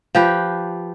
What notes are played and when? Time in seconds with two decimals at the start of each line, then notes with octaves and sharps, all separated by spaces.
0.15 F3 G4 B4